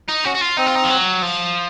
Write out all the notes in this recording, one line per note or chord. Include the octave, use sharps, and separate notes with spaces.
D#4
C#4 F#4
F#4
F4
C4 D#4
F4
D#4
F3
F#3
F3